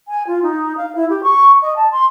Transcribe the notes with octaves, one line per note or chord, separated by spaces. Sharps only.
G#5
F4
D#4
F5
E4
G4
C#6
D#5
A5
C6